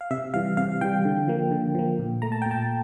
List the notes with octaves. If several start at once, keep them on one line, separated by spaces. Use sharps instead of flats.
F5
C3 E5
E3 G3 F5
C3 F5
E3 G3 G5
D3
F3 A#3
D3
F3 A#3
A#2
A3 A#5
A5
A#2 G5
A5